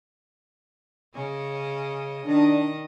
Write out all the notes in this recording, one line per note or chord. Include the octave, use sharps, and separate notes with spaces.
C#3 C#4 D#5
D#3 D4 D#5